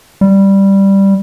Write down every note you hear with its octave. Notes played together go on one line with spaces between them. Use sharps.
G3